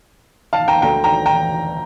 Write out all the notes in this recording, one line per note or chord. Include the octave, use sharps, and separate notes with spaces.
F5 A5
G5 A#5
D2 D3 G5 A#5
G5 A#5
G5 A#5